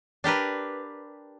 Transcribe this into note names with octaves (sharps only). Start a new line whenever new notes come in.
D4 G4 A#4 B4